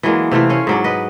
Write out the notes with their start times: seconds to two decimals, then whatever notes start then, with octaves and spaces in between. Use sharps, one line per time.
0.03 E3 F#3 G#3 A#3
0.31 C3 E3 A3 F4
0.49 C#4 F5
0.67 G#2 F#3 D5
0.84 B4 D#5